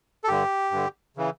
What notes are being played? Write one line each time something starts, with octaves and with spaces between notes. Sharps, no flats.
A4
G2 D3 G4
G2 D3
C#3 E3